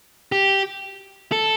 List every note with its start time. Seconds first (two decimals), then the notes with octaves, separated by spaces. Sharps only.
0.32 G4
1.32 A4